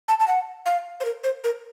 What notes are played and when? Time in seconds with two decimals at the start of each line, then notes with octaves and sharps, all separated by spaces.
0.08 A5
0.20 A5
0.28 F#5
0.66 F5
1.00 C5
1.05 A#4
1.24 C5
1.44 A#4